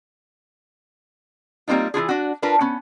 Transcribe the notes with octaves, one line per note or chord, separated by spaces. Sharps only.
G3 A#3 C4 D#4 F4
E3 E4 F4 G#4
D4 F#4
D4 F4 A#4 B4
B3 C#4